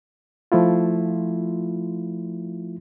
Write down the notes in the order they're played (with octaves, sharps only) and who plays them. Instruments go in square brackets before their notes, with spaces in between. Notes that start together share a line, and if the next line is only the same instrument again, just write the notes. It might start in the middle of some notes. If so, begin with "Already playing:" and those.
[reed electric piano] F3 A3 E4 F4